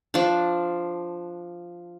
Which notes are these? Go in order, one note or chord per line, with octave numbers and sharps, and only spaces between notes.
F3 D4